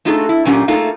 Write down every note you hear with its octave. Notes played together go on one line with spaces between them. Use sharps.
A3 D#4 F4 F#4 G#4 A4
E4
A#2 F#3 C#4 F4 G4 F#5
A3 A#3 D#4 F4 G#4 A4